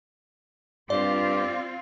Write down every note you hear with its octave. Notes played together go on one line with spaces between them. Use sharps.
G2 C4 F4 G4 D5